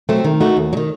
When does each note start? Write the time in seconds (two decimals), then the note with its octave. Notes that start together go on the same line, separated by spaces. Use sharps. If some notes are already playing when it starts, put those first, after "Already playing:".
0.09 F#3 A3 C4
0.24 D#3
0.41 A3 D#4 F#4
0.57 D#2
0.73 F#3
0.77 D#3